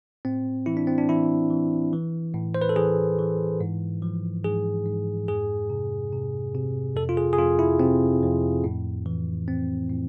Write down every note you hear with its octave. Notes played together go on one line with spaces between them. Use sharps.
A2 C4
E3 E4
D4
C4
D4
E3 E4
E3
E3
A2
C5
B4
A4
E3 G#4
E3
G#2
F3
G#2 G#4
G#2
F2 G#4
C3
C3
C3
F2 A4
F4
G#4
G#4
F2 F4
E4
C3 C4
F2
A2
E3
A2 C4
A2